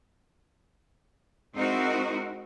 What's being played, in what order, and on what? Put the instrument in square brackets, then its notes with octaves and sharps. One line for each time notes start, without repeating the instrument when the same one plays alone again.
[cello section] G#3 C4 D#4 E4 F#4 A#4